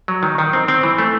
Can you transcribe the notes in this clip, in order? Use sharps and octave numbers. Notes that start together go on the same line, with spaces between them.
F#3
D#3
D#3
C4
C4
E3
A3